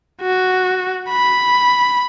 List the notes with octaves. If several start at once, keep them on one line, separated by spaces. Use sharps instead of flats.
F#4
B5